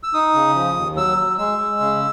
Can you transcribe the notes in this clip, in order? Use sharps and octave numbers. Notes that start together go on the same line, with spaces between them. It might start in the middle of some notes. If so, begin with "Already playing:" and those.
E6
D#4 D#6
C#3
F3
D#2
F#3 E6
F#3
G#3 E6
G#3
C#3